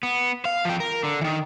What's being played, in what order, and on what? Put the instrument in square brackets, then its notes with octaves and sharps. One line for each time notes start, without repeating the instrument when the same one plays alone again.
[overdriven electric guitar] B3
F5
F3 G5
A#4
D3
D#3 E3